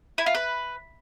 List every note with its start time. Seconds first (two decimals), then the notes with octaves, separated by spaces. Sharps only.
0.18 E4
0.26 F4
0.35 B4